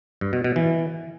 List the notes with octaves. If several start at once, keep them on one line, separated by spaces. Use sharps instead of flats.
G2
B2
B2
E3